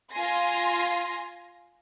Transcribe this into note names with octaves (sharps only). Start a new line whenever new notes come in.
F4 G#5 C6 A#6 C7